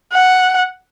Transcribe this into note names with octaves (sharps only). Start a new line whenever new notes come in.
F#5